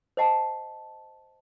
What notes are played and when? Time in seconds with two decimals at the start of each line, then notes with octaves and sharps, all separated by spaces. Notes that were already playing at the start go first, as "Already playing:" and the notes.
0.17 C5 D#5 F#5 A5